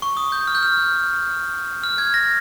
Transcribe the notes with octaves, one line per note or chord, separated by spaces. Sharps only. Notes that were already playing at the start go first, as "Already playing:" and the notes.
C#6
D#6
G6
F6
G6
F6
F6
G#6
A#6